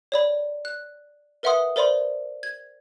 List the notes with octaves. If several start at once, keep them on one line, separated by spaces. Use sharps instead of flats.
C#5 D5 B5
F#6
A#4 B4 E5 F#5 C6 D#6
A#4 C5 D5 B5 C6
G#6